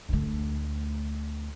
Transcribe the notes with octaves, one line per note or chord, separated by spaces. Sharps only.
D2 A3